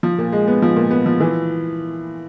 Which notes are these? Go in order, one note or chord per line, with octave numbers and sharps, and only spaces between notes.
F3
A#2
G#3
B3
F3
A#2
B3
F3
E3